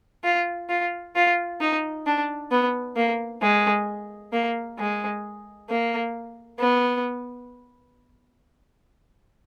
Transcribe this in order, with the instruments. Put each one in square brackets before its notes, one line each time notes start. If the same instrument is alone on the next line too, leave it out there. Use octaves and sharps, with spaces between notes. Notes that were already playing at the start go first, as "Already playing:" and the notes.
[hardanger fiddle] F4
F4
F4
D#4
D4
B3
A#3
G#3
A#3
G#3
A#3
B3